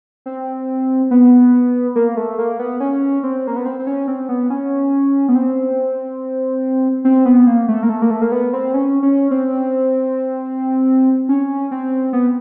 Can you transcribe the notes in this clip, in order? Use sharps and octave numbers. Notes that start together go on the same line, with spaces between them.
C4
B3
A#3
A3
A#3
B3
C#4
C4
A#3
B3
C4
C4
C#4
C4
B3
C#4
B3
C4
C4
B3
A#3
A3
A#3
A3
A#3
A3
A#3
B3
C4
C#4
C#4
C4
C#4
C4
B3